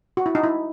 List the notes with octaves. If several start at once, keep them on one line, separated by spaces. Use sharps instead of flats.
F#4
E4
D#4
E4